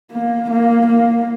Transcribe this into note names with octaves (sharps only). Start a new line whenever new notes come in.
A#3
A#3
A#3